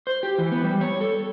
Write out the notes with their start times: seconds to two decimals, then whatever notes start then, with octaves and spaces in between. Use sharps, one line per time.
0.07 C5
0.23 G4
0.38 E3
0.52 B3
0.64 G3
0.81 C#5
1.01 A4